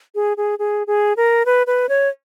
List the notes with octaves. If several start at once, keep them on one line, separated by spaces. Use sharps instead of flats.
G#4
G#4
G#4
G#4
A#4
B4
B4
C#5